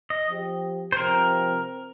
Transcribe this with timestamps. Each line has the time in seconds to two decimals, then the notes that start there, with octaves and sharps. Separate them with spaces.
0.10 D#5
0.28 F3 C4 G4
0.92 C5
0.97 C3 F3 C4 A#4